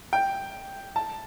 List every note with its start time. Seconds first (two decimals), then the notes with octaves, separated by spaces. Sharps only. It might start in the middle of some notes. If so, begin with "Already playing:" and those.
0.13 G5
0.96 A5